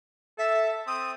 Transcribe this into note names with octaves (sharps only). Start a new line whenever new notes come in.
A4 E5
C4 D#6